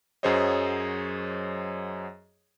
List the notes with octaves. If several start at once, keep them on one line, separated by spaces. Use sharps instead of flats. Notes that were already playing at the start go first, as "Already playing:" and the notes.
F#2 F#3 G#4 C5 C#5 D#5